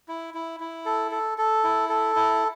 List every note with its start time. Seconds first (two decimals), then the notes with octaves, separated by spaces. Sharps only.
0.08 E4
0.34 E4
0.60 E4
0.86 A4
1.12 A4
1.38 A4
1.64 E4
1.89 A4
2.16 E4